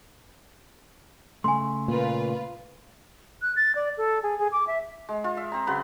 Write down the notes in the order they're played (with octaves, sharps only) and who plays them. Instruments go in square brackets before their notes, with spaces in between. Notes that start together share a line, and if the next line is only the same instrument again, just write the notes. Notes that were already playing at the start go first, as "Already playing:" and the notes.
[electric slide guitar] C#3 A3 [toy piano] G#5 C6
[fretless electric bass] A#2 [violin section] F4 B4
[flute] F#6
A6
D5
A4
G#4
G#4
D6
E5
[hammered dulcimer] G#3
F4
E5
C4 A#5
C#3 F#3 B4 C6